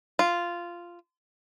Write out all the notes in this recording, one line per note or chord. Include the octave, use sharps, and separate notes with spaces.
F4